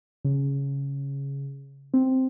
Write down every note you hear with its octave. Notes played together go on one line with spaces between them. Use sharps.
C#3
C4